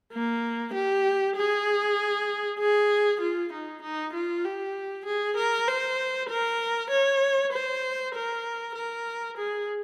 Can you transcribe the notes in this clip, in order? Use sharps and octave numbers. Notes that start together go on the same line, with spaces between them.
A#3
G4
G#4
G#4
F4
D#4
D#4
F4
G4
G#4
A#4
C5
A#4
C#5
C5
A#4
A#4
G#4